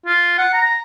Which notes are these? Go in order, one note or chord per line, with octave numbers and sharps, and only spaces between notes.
F4
F#5
A#5